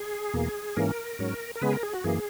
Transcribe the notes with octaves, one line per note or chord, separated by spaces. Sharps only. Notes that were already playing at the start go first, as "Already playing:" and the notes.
Already playing: G#4
E2 B2 A#3
G#2 E3 A#3 C#4 A#4
G#2 F#3 C#4
A#4
C#3 G#3 B3 B4
G#4
A#4
G#4
F#4
F#2 E3 A#3 G#4